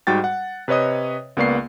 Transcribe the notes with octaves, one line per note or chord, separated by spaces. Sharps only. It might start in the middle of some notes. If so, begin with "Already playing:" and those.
G#2 G3 F#4 G5 A6
F#5
C3 B4 C#5 D#5 D#6
C#2 A#3 B3 D5 C#6 C7